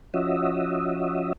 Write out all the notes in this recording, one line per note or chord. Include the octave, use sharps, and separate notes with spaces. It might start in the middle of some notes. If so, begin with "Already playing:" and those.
F3 C#4 F#4 D#5 E5